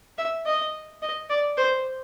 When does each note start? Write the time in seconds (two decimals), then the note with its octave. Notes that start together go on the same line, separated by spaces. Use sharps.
0.18 E5
0.46 D#5
1.02 D#5
1.30 D5
1.57 C5